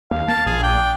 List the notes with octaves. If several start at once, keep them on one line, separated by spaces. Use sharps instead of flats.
D#2 F5
A#3 A5
A#1 G#4
D4 G5